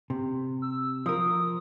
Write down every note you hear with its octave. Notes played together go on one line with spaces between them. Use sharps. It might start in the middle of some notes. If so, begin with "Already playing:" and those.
C3
E6
F3 A#4 D#6